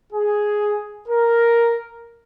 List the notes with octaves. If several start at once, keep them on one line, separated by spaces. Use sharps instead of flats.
G#4
A#4